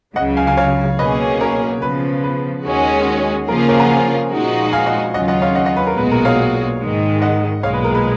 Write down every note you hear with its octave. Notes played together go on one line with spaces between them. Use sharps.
C#2 C#3 F#3 D#5 F#5
F5 G#5
F5 G#5
C#5 F5
B1 B2 A#3 C#4 G#4 B4 D#5
A#4 C#5
C#3 F3 B3 B4
B4
D#2 D#3 G#3 C#4 F#4
C#3 F3 A#3 F4 G#4 A#4
A#4 C#5
F#5 A#5
F5 G#5
A#2 F3 G#3 D#4 F#4
F5 G#5
D#5 F#5
D#2 C#3 F#3 C#4 F4 D#5 F#5
D#5 F#5
C#5 F5
D#5 F#5
D#5 F#5
B4
A#4
B1 A#2 G#3 B3 F#4 B4
A#4
C#5 F5
G#2 D#3 G#3
D#5 F#5
B1 A#2 G#3 C#5 F5
B4
A#4
B4